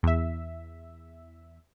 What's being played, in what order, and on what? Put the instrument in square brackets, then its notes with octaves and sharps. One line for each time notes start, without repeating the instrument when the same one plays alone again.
[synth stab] E2 E5